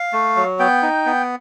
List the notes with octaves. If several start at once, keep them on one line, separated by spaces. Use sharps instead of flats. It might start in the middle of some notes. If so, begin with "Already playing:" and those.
Already playing: F5
A3
F#3
B3 G5
D#4
B3